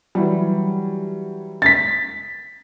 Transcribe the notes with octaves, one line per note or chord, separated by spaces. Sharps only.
E3 F#3 G3
A6 B6